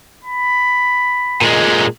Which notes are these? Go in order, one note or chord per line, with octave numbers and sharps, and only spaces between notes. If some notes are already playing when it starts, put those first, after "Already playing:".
B5
A#2 G#3